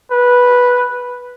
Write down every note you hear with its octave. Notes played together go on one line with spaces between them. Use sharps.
B4